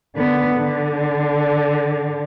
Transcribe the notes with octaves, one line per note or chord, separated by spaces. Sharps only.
D3 B3
D3